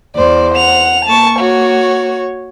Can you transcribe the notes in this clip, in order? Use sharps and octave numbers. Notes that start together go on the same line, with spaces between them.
E2 C5 D5
F#5 F7
A#3 A5 C#6
F#4 C#5